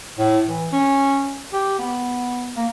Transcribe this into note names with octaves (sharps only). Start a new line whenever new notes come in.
A2
E3
C#4
G4
B3
A#3